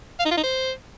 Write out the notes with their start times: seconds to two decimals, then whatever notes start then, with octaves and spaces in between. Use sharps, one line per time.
0.20 F5
0.25 D#4
0.31 F4
0.37 D#4
0.43 C5